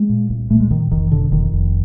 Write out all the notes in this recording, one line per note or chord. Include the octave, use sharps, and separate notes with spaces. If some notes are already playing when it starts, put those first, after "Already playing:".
Already playing: G#3
A#2
C2
A#2 A3
G#3
C2 D#3
F1 D#3
B2 D3
F1 D#3
F1